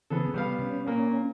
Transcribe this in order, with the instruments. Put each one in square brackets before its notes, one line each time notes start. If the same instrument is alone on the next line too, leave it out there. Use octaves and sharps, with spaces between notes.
[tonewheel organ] C#3 E3 C4 [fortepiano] B3 G#4 A4
[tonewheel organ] C3 [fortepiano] G3 B3 F5
[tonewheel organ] C#4
[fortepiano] A#2 A#3